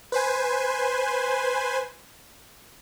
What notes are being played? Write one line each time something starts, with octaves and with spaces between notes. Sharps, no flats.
B4 C5 G#5